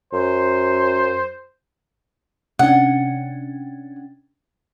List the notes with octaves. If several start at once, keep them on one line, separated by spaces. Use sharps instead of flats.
F#2 C5
C3 C#4 D4 F#5